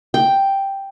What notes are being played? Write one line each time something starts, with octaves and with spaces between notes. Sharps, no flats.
G5